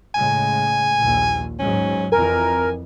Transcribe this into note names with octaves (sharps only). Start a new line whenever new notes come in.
A2 C#3 G#3 G#5
A#1 D#2
G#2 F#3 C#4
F2 E3 A#4 G#5